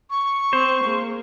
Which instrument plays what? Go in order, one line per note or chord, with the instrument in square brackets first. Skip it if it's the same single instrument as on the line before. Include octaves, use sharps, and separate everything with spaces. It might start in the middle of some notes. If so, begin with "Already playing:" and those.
[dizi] C#6
[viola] C4 [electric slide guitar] C5
[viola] A#3 G#4